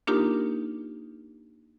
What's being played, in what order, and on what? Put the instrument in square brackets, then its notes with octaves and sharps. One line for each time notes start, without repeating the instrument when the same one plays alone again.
[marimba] A#3 D4 D#4 F4 G4 A#4